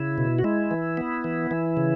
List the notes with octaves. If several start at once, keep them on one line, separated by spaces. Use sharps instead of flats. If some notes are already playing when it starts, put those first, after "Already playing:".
Already playing: C#3 E4
B2
F#4
G#3 E4
E3
B3
E3
E3
C#3